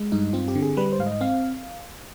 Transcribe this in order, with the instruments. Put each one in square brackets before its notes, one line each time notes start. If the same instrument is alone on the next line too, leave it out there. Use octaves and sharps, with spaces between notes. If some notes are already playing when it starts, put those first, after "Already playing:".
Already playing: [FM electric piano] G#3
G2 D#4
C4 F4
G4
D3
G#4
G3 B4
C5
G#2 F5
D#5
C4 F5